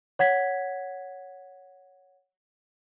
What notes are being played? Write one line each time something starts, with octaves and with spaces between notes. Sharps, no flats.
C#5 F#5 G#6 B6